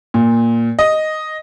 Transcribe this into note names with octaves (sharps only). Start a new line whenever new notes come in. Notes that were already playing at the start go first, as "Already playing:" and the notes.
A#2
D#5